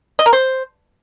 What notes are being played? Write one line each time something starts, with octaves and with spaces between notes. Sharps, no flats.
D#5
A#4
C5